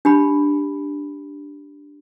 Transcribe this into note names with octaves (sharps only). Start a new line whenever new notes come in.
D4 G4 B5